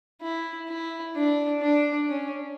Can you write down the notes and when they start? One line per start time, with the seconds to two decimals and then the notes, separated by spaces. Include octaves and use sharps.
0.22 E4
0.68 E4
1.15 D4
1.62 D4
2.09 C#4